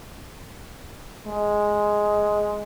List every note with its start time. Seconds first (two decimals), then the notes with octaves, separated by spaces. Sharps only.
1.27 G#3